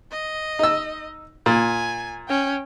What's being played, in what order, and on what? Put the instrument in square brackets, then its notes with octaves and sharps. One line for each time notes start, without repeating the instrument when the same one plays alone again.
[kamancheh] D#5
[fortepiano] D#4 E6
[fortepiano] A#2 [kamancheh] G#5
[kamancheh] C#4 G5